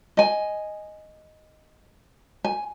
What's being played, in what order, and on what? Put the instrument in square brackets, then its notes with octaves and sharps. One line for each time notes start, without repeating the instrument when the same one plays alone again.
[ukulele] D#5 G#5
G#5